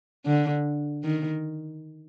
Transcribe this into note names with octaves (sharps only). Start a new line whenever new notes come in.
D3
D#3